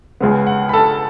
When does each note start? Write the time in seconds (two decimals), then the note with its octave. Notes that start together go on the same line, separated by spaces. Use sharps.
0.20 C#2 C#3 G#3 B3
0.47 F#5
0.69 B5
0.73 A4 A5